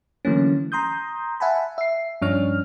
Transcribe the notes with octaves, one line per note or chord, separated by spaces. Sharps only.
D3 E3 F#3 A3 A#3 C#4
A#5 C6 D#6 G6
E5 F#5 G#5 A5 B5
E5 C7
G2 F3 C#4 D4 C#5 F6